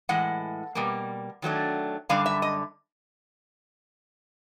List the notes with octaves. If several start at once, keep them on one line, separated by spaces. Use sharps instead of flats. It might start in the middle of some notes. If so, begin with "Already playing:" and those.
A2 E3 G#3 F#5
B2 G3 A#3
D#3 F#3 A3 D4
F#2 D3 G3 D4 F5
E5
D#5